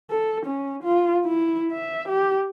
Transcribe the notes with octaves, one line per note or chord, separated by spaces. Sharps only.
A4
C#4
F4
E4
E5
G4